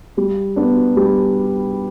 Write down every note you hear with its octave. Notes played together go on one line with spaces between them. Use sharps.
G3
B3 D4
G3